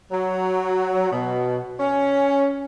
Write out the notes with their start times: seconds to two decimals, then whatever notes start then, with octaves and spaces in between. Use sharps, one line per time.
0.11 F#3
1.10 B2
1.80 C#4